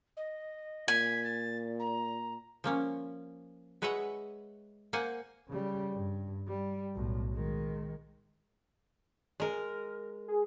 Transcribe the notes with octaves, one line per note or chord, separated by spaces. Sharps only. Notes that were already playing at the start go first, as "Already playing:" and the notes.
D#5
A#2 G#5 B6
A6
A#5
F3 A#3 C#4
G#3 B4 C#5 D#5 E5 F#5
A#3 C5 F#5 G#5
C#3 G3
G2
G3
B1 A2
D#3 G#3
G#3 A#4
G#4